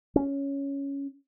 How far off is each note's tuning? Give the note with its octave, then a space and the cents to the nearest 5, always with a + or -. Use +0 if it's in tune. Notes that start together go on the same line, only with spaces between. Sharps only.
C#4 +5